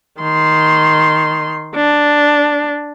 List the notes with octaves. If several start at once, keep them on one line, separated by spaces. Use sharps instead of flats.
D#3 C6
D4